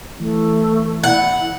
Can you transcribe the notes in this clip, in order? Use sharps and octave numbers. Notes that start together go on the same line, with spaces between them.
E3 A3
E4 F#5